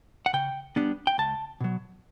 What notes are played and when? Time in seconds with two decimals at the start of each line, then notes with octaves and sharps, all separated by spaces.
0.26 F#5
0.33 C#3 G5
0.76 G3 B3 D4
1.07 G5
1.18 C#2 A5
1.60 B2 F#3